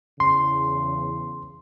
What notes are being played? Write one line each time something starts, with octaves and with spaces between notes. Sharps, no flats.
E2 C#3 C6